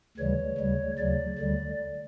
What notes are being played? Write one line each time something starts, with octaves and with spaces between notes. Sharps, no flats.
D2 C#3 E3 G3 C#5
D2 C#3 G3
D2 C#3 F#3 D5
D2 D3 G3